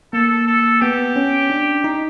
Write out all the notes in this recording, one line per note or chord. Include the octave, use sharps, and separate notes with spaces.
A#3 A4
A4
B3 G4
C#4
D4
D#4